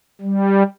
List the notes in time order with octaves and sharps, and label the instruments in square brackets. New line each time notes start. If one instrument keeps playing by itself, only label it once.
[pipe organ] G3